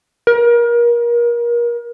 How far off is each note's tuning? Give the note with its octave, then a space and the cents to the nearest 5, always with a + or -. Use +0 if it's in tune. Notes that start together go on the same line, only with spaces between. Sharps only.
A#4 +30